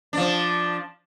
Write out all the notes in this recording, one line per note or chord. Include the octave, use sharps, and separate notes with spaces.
F3 D4